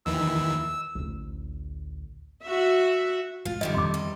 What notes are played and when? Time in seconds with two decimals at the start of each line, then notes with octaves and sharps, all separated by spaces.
0.06 D#2 D#3 E3 E6
0.95 A1 D2
2.43 F#4 E5
3.45 G#3 F4
3.61 G#2 D3 D#3 G3 D#5
3.74 F2 C6 D6
3.94 E2 G3 D#5